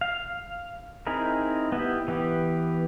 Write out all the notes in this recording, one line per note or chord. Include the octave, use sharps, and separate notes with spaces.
F5
C4 D#4 E4 G#4 A#4
B3 E4 G4
E3 B3 G4